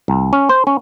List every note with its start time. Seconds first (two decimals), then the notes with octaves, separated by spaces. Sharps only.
0.08 C2
0.33 C#4
0.49 C5
0.67 C#4